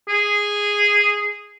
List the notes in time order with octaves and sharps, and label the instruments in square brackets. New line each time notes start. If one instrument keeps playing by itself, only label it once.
[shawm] G#4